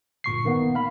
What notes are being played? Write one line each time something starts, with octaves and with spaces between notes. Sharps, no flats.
G1 A#2 C#6 C7
D#3 A#3 B3
F5 B5